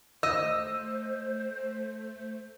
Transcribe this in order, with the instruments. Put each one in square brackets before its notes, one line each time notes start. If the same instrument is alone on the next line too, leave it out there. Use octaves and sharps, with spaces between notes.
[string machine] A3 [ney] C5 [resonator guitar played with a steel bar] D#5 [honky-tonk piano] E6